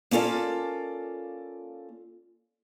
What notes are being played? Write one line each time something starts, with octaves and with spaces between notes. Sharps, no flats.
A#3 C#4 F4 A4 D5